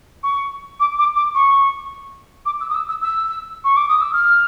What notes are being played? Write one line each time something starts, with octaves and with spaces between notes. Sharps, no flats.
C#6
D6
D6
D6
C#6
D6
E6
D#6
E6
E6
E6
C#6
D6
D#6
E6
F6